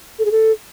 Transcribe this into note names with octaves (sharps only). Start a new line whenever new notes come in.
A4
G#4
A4